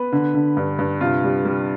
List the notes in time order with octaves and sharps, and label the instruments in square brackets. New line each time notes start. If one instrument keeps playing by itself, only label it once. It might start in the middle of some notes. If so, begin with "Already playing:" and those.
Already playing: [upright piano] B3 B4
D3
D3
G2
G2
C3 F4
G3
G3